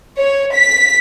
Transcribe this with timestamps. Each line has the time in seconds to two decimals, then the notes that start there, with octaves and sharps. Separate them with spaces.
0.19 C#5
0.54 B6